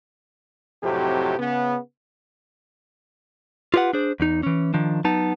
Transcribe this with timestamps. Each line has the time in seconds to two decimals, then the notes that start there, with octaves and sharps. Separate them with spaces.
0.84 F2 A2 C3 F#3 G4
1.38 C#3 B3
3.74 F4 G4 B4 D5 F#5
3.93 D4 G#4 C5
4.20 E2 D#4
4.43 E3 C#4
4.74 D#3 F3 D4
5.04 F#3 B3 D#4 A5